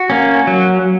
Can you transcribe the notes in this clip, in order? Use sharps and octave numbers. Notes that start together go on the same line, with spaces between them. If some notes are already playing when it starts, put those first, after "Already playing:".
Already playing: F#4
A#3 C#4
F#3